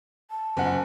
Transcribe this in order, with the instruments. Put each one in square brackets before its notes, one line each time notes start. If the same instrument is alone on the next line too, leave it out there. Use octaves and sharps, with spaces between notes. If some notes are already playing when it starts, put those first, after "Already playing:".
[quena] A5
[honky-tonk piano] F#1 F#5